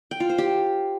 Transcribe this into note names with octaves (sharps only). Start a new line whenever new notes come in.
G5
F4
C5
G4